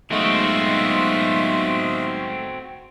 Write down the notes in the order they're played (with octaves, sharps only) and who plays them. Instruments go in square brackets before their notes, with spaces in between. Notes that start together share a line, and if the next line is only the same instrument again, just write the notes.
[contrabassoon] B1 [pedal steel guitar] G#3 A3 [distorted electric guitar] C4 F#4 [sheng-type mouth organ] F4 D#5 E5